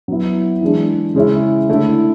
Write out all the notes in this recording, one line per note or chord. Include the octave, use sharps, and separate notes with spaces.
F#3 B3 E4
E3 G#3 D4
C#3 G#3 C#4 E4
D3 A3 E4